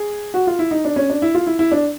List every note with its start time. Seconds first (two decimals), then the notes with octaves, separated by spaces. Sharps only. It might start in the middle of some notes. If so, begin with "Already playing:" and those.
Already playing: G#4
0.34 F#4
0.47 F4
0.59 E4
0.71 D#4
0.85 D4
0.96 C#4
1.10 D4
1.22 E4
1.35 F4
1.47 E4
1.59 E4
1.72 D4